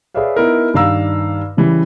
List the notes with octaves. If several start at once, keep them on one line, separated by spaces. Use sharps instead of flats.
G#4 B4 C#5 D5 E5 F5
B3 D#4 E4 A#4
G2 D#3 D5 F5 A#5 E6
C#3 E3 G3